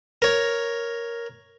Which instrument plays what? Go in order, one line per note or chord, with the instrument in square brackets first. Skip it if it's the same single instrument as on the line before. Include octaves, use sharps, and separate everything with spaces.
[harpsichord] A#4 C#5